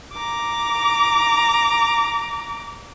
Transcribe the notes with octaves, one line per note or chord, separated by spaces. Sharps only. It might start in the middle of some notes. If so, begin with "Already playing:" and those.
A#5 D6